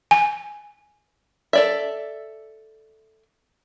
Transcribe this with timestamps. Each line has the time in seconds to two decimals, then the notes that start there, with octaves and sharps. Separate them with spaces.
0.11 G#5
1.53 A4 D5 E5